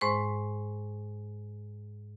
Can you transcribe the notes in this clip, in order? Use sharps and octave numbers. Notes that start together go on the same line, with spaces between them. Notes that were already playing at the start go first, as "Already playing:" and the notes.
G#2 G#3 C5 C#6